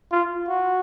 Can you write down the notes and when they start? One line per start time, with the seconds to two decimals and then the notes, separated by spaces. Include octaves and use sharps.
0.12 F4
0.49 F#4